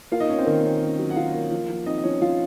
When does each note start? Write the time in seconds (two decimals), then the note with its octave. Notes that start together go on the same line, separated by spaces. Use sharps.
0.12 A#3 F4 F5
0.20 D#4 D#5
0.29 A#3 C#4 C#5
0.38 C4 C5
0.46 D#3 A#3 A#4
0.64 C#4
0.82 C#4
0.99 F#3
1.10 F#5
1.16 F#3 F4 F5
1.34 A#3
1.51 F3
1.69 F3
1.86 C4 D#4 D#5
1.98 D#5
2.04 F3 C#4 C#5
2.21 F3 F4 F5